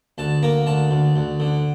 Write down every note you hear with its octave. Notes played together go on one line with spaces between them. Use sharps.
D2 A5
A#3 A#5
D2 A5
D2
D2
D3